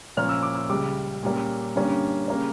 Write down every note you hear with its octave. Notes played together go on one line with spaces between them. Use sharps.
A#2 F3 A#3 C#4 F6
E6
D6
E6
C#2 C#3 G3 D6
A#2 G3 A#3 C#4
G2 D3 G3 A#3 C#4
C#3 G3 A#3 C#4